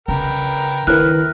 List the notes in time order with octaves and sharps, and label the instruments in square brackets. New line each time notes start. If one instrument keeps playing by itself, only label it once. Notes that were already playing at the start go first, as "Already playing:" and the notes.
[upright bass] C#3 [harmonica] A#4 B4 G5
[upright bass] D#3 [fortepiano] E4 A#4 B4 [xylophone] F6 F#6